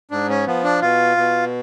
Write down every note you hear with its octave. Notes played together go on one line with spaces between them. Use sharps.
G#2 D4
C#4
F3 B3
D4
B2 F4
B2